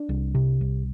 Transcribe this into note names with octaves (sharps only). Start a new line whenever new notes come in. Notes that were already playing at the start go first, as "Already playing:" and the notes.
Already playing: D4
C2
C3
C2